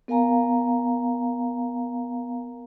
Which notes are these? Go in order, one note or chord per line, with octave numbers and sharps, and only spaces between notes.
B3 A#4 F5 G#5 A#5